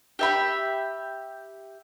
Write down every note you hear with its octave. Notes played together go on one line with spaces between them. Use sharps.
G4 E5 B5